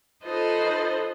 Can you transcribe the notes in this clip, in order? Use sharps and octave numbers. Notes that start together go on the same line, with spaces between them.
D#4 F4 A4 B4 C5 D#5